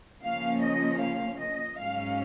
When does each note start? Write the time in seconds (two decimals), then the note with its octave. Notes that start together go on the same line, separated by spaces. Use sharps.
0.22 C#3 F3 A#3 C#4 F5
0.61 D#5
1.01 F5
1.39 D#5
1.78 G#2 F#3 C#4 F5